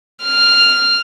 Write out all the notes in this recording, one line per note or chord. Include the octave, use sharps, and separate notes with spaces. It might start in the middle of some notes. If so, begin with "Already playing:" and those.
F6